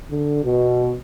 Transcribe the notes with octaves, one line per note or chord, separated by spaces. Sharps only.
D3
B2